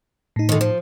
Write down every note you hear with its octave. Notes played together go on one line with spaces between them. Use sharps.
A2 D#4
D3 D#3
F3